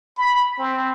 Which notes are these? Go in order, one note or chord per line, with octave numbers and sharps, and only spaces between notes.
B5
C4